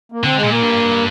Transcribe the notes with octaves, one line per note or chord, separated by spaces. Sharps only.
A#3
D3 C4
G#3
A#2
A#3
G2